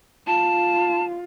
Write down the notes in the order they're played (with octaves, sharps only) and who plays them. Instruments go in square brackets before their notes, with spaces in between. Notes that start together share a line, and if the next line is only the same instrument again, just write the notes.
[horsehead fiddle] F4 [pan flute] A5